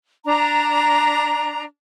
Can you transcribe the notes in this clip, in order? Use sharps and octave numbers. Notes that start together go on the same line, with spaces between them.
D4 A#5